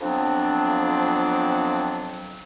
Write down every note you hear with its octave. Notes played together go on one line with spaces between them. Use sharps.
F2 F3 F#3 B3 C4 D4